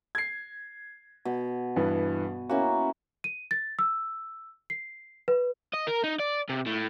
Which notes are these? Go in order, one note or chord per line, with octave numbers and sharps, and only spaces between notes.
G#6 C7
B2
G2 E3 B3
A#3 C#4 E4 F#4
D#7
A6
E6
C7
B4
D#5
A#4
D#4
D5
C3
A2